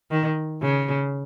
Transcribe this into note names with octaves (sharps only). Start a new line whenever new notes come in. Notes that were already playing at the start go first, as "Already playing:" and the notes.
D#3
C#3